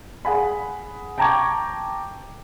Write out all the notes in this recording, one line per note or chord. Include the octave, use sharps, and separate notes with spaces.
G#4 F#5 G#5 B5
G5 A5 A#5 C#6 D6 G#6